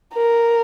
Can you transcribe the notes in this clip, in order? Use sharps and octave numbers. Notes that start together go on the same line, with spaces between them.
A#4